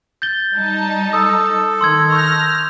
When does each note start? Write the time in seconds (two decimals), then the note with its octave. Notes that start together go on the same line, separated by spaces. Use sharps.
0.22 G6 A6 G7
0.55 G3 D#4 A5
1.13 A4 D#6
1.81 D#3 C6 E6 G#6
2.12 C#6 F6 G6 A#6